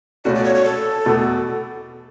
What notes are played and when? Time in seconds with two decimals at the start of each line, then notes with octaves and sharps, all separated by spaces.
0.25 C#2 B2 A3 C#4 F#4 D5
0.35 D5
0.44 C#5
0.55 C#5
0.64 A4
1.06 E2 B2 A3